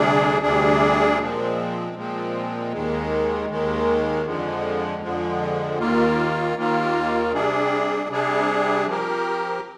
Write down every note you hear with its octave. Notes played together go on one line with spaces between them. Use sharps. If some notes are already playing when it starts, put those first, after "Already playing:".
Already playing: D2 C3 G3 D4 G#4
D2 C3 G3 D4 G#4
A#2 F3 G#3 C4
A#2 F3 G#3 C4
D#2 D#3 G#3
D#2 D#3 G#3
F2 D3 F3 G#3
F2 D3 F3 G#3
D#2 D#3 A#3 F4
D#2 D#3 A#3 F4
C3 G3 D4 G#4
C3 G3 D4 G#4
F3 C4 G4 A#4